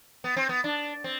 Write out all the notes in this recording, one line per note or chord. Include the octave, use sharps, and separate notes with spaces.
B3
C4
B3
D4
C4